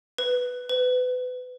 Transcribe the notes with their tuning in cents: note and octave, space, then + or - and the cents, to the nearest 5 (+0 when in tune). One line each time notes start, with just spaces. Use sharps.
B4 +5
B4 +30